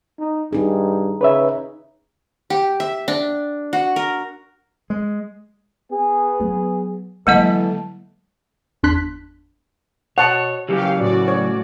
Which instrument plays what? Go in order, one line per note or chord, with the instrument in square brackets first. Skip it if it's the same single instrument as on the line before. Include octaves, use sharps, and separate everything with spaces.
[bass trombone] D#4
[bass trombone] G2 [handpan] D#4 G#4
[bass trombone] C#3 [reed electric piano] B4 C#5 E5
[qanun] G4
E5
D4
F#4
A#4
[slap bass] G#3
[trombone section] B3 G#4
[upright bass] F#3
[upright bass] D3 F#3 [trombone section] E3 A4 [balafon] G#3 A#3 D#5
[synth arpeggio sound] G1 E2 D4 C6 F#6 B6
[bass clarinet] B2 [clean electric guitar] C#5 [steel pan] F#5 A5
[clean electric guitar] C#3 E3 F#3 [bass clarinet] C#4 [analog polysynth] G4 F5
[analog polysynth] A2 F#4 D5
[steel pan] C#5